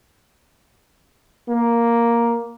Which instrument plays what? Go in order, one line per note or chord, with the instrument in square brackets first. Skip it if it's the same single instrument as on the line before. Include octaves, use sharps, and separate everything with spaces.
[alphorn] A#3